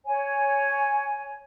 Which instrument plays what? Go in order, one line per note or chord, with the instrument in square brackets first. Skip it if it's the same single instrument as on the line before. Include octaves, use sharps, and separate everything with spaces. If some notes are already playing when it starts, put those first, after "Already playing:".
[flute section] C#5 G#5